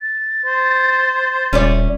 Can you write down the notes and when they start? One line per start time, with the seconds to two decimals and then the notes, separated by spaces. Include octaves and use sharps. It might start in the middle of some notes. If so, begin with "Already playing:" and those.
0.01 A6
0.46 C5
1.53 D#1 C#4 E4 D5